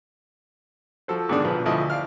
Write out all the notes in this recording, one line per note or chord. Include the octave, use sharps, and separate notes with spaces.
F3 F#4 A4 C5
G#2 B2 D3 D#3 D4
B1 F3 B4
D2 F3 E4 D#5
D5 F5 F6